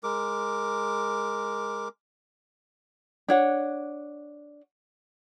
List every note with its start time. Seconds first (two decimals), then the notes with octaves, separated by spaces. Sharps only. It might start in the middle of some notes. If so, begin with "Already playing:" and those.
0.03 G#3 A#4 D6
3.28 D4 C#5 F#5